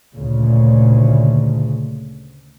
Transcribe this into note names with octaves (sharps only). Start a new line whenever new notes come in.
D2 A#2 C#3